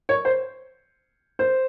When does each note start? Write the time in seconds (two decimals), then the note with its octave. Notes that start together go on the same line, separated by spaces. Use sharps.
0.09 C#5
0.25 C5
1.39 C5